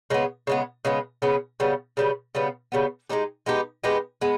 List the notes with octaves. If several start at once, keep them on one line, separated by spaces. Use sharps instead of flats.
C#3 G#3 B3
C#3 G#3 B3
C#3 G#3 B3
C#3 G#3 B3
C#3 G3 B3
C#3 G3 B3
C#3 G3 B3
C#3 G3 B3
G#3 B3 D#4 G4
G#3 B3 D#4 G4
G#3 B3 D#4 G4
G#3 B3